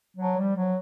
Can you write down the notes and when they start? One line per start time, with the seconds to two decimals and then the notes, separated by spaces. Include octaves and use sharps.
0.18 F3 F#3
0.37 F3 G3
0.56 F3 F#3